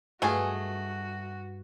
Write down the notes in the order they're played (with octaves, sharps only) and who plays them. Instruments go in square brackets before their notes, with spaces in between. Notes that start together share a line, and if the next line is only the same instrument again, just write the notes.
[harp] G2 [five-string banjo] A3 G#4 [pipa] F4 D#5 G#5 [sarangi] F#4